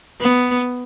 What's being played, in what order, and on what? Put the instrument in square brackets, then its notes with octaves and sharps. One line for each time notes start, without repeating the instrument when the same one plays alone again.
[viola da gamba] B3